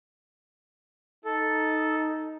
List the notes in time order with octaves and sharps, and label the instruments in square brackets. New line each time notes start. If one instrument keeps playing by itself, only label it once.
[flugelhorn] D#4 [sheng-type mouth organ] A4